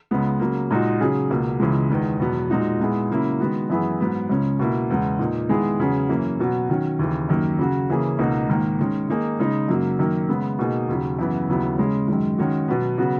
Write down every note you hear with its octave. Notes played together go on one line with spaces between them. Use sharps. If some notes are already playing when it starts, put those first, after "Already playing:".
C#2 C#3 G#3 B3
C#3 F#3 A#3
A#2 G#3 D#4 F#4
C#3 F#3 C#4 G#4
C#2 B2 A#3
C#2 C#3 E3 G#3
E2 D#3 G#3
E2 B2 F#3 B3
A#2 G#3 D#4 F#4
A#2 G#3 B3 E4 G#4
C#3 F#3 A#3 C#4 E4
D#3 G#3 B3 F#4
F#2 E3 B3 E4 G#4
G#2 F#3 B3
C#2 C#3 G#3 C#4
B2 A#3 E4
E2 C#3 G#3
A#2 A#3 D#4
D#3 G#3 B3 E4 G#4
E2 C#3 F#3 C#4 G#4
F#2 E3 A#3 C#4
B2 F#3 B3
D#3 F#3 C#4
D#2 C#3 E3
F#2 D#3 A#3
C#3 F#3 C#4 F#4
C#3 E3 A#3 C#4 G#4
C#2 B2 A#3 D#4 F#4
G#2 D#3 A#3
D#3 G#3 C#4
D#3 A#3 D#4 G#4
C#3 G#3 D#4
F#2 C#3 F#3 A#3
F#2 D#3 A#3
C#3 G#3 B3
B2 A#3 D#4 G#4
D#2 C#3 F#3
F#2 C#3 E3 B3
D#2 C#3 F#3 B3 E4
C#3 G#3 C#4
F#2 D#3 G#3
D#3 G#3 C#4 F#4
B2 F#3 B3
C#3 F#3 B3 F#4